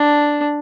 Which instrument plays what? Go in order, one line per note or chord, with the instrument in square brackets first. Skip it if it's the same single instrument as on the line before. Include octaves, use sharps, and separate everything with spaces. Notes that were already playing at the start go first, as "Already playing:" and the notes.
Already playing: [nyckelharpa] D4